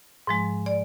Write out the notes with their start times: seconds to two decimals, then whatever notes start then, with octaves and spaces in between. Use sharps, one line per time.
0.27 G#2 F3 G#3
0.66 D5